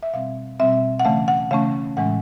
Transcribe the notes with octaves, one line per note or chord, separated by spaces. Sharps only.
E5
B2 G3 C4 F5
B2 G3 C4 E5
F#5
C#3 E3 A3 C#4 F5
F#5
C#3 E3 A3 C#4 F5
A2 E3 G#3 C#4 F#5